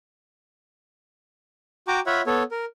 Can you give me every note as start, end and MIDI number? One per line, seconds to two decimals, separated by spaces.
1.88 2.00 66
1.88 2.00 79
1.88 2.00 82
1.88 2.00 86
2.06 2.22 65
2.06 2.22 73
2.06 2.22 76
2.06 2.22 78
2.06 2.22 83
2.27 2.43 59
2.27 2.43 69
2.27 2.43 73
2.51 2.65 70